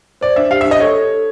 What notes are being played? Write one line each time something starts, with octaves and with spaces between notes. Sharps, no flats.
C5 D5
D4 E5
G4 F5
E5
D4
D#5
A4 C#5
A4
A4